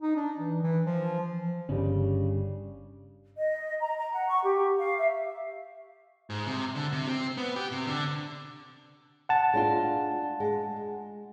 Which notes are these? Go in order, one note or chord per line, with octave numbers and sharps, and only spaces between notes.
D#4
D4
E3
E3
F3
G1 G2 C#3 G3 C#4
D#5
A#5
A#5
F#5
C#6
G4
F5
E5
G#2
C3
D3
C3
C4
B3
G4
C3
D3
F#5 A5
G#3 D4 F4
G#3